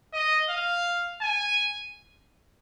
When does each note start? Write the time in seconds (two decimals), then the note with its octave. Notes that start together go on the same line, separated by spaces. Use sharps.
0.13 D#5
0.50 F5
1.22 G#5